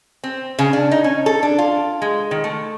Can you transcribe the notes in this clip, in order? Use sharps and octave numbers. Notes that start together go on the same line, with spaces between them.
C4
C#3
D4
D#4
C#4
A4
D4
F4
G#3
D#3
A3